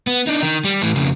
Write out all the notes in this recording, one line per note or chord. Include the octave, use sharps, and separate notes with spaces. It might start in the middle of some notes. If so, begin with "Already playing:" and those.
B3
D4 D#4
D#3
G3
A2 E3
F2 C#3